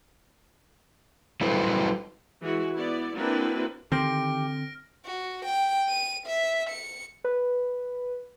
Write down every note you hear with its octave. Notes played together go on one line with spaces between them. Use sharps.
F#3 G3 E4 A4 B4 C5
E3 G#3 E4 F#4
B3 E4 D5
A#3 C4 D4 E4 F#4 B4
D3 D#3 C4 G4 C5 F6 A#6 D7
F#4
G5
D#7
E5
C#7
B4